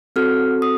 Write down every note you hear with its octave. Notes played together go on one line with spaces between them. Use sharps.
C4 F#4 A4 F6
D#6